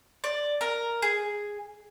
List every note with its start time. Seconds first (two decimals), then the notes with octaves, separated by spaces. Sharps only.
0.24 D5
0.61 A#4
1.02 G#4